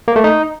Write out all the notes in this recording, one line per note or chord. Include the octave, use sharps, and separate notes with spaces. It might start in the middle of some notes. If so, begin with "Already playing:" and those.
A#3
A3
D#4